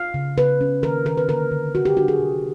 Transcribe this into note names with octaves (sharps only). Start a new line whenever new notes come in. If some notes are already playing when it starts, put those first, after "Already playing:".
Already playing: F5
C#3
C#3 B4
C#4
D#3 A#4
D#3 A#4
B4
D3 A#4
D3
C3 F#4
G4
D4 F#4
G#4
C3